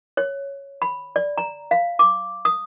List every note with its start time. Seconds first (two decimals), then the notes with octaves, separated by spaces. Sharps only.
0.17 C#5
0.82 B5
1.16 D5
1.38 A#5
1.71 F5
1.99 D6
2.45 D#6